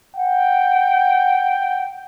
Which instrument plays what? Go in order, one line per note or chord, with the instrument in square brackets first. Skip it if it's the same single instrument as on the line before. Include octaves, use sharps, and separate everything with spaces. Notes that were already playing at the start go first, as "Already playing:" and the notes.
[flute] F#5 [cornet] G5